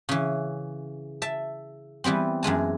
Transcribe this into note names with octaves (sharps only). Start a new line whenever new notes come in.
C#3 E3
E5 A5
E3 G3 B3 C4
F#2 E3 G#3 A5